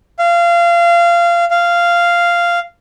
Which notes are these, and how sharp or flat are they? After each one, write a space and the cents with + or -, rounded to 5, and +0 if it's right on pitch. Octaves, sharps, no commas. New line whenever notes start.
F5 -25
F5 -10